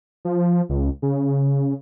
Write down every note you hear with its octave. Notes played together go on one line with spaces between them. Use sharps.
F3
C#2
C#3